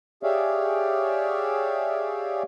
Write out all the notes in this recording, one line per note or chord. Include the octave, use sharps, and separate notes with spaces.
G4 G#4 C#5 D5 E5 F5